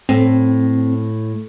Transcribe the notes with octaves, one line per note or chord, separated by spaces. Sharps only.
A2 C4